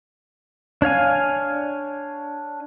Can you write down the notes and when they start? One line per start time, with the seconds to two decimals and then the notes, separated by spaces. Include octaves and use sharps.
0.82 D4 C#5 F5 G#5